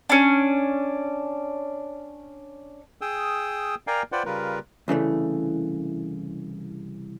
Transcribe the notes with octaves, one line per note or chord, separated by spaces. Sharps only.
C#4 D4
G#4 G5 D#6 E6
A#4 D5 F5 G5 G#5 A#5
F4 B4 C5 D5 F#5 G5
C#3 G3 F4 A#4 B4
C2 C#3 E3 A3